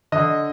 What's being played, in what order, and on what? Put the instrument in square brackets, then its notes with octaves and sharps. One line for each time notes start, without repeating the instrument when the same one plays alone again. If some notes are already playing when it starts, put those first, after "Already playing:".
[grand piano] D3 D#5